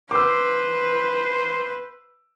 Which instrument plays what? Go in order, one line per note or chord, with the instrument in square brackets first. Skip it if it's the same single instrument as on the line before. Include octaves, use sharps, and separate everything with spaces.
[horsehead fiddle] B4 [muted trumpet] C5 [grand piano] D6 E6